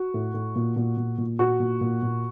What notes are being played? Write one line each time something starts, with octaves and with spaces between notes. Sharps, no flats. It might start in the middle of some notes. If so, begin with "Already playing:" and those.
Already playing: F#4
A2
A2
A#2
A#2
A#2
A#2
A#2 F#4
A#2
A#2
A#2